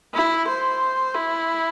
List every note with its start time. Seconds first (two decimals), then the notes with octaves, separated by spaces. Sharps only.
0.14 E4
0.48 C5
1.15 E4